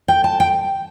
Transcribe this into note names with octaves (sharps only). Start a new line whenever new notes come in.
G5
A5
G5